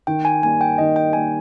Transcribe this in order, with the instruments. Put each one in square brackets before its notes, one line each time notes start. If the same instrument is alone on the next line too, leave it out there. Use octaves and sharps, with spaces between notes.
[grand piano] D#3 [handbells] G5
[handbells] G#5
[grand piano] A#3 [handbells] G#5
[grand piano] G3
[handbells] G5
[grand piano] D#3 [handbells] D#5
[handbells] G5
[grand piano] G3 A#3 [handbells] G#5